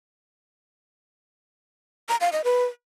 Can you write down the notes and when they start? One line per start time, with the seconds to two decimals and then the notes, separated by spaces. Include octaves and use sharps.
2.09 A#5
2.21 F5
2.32 D#5
2.44 B4